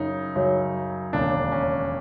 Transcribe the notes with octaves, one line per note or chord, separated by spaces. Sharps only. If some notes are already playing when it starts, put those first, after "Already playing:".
Already playing: F#2 C#3 F#3 D#4
F#2 C#3 F#3
E1 D#2 C#3 D4
C#4